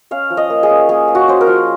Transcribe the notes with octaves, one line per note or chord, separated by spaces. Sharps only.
C#4 F5
F3
D#5
A#3
G#4
C#4
A#3 G#4
A#3
F#4
C#4 C5
A#4
F3